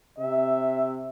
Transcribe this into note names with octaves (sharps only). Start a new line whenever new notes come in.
C3 E5